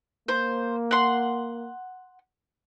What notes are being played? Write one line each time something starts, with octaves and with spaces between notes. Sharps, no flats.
A#3 C5
F#5 C6